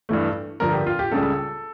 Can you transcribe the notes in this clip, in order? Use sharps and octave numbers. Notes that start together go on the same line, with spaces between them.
G2 E3 A3
G2 D3 F3 A#4
G4
F4
G4
C#2 C#3 G3 A4